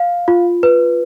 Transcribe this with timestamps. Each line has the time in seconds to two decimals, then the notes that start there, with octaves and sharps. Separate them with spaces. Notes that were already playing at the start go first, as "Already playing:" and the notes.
Already playing: F5
0.28 F4
0.63 B4